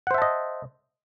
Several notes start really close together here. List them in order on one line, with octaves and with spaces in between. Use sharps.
F#5 C5 E5 A5 D#5